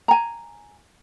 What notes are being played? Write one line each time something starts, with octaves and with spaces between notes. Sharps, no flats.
G#5 A#5